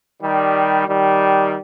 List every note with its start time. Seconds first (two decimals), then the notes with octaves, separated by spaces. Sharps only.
0.21 D#3 G3
0.87 D#3 G3